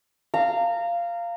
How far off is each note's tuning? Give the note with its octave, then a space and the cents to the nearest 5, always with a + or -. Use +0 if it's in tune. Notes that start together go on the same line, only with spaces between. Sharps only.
F5 -15 A#5 -25